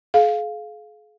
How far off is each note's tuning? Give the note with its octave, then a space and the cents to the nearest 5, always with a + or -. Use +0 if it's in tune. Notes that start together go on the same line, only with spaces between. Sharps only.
G#4 +40 F5 +5